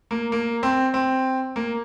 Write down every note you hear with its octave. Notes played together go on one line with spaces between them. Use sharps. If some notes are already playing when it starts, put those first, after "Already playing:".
A#3
A#3
C4
C4
A#3